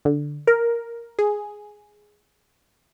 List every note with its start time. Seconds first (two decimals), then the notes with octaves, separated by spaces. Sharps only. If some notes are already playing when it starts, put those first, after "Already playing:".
0.05 D3
0.47 A#4
1.19 G#4